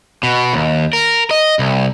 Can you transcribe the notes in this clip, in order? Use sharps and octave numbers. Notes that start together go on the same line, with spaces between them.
B2
D#2
A#4
D#5
C2